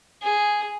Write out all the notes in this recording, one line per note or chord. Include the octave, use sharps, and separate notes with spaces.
G#4